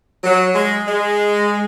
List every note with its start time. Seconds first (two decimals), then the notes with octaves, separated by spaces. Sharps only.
0.24 F#3
0.55 G#3
0.87 G#3